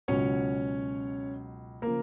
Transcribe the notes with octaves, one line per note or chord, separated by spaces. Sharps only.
C#2 B2 F#3 C#4 C#5
C#3 F3 A#3 A#4